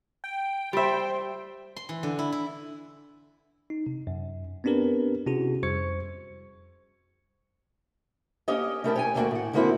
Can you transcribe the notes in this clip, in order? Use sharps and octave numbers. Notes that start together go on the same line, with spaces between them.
G5
G3 C5 E5
C6
E3
D3
E4
E4
D#4
C3
F#2
B3 C4 D4 G4 A#4 B4
C3 C#4 E4 F#4 G#4
F2 G3 C5 C#6 G#6 C#7
A#3 C#4 G4 C#5 D#5
A3 C#4 E4 A#4 G5 A5
C#5 G5 G#5
D#2 A3 A#3 D4 F#4 G5
A2 F#5
D3 G#3 A#3 C4 E4 F#4